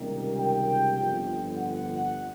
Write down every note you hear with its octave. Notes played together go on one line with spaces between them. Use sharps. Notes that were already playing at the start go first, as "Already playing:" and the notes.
Already playing: C#2 C3 D#3 G3 A#3
G5
G1 F2 D3
F#5